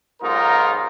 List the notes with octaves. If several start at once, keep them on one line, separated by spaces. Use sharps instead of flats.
B1 G#2 D#4 F4 A#4